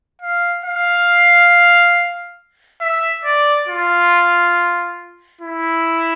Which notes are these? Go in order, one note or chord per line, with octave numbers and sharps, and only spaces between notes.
F5
F5
E5
D5
F4
E4